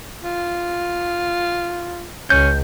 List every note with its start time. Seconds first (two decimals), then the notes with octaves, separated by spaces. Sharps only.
0.24 F4
2.30 C#2 C#4 G6